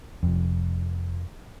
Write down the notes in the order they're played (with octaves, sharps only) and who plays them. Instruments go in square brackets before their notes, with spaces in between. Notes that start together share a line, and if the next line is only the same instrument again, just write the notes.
[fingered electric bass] F1 F2